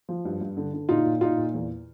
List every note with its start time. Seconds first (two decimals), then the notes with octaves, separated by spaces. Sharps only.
0.09 F3
0.25 G2
0.41 G2
0.57 D3
0.74 D3
0.89 A#2 D#4 F4
1.05 A#2
1.21 A#2 D#4 F4
1.38 A#2
1.54 E2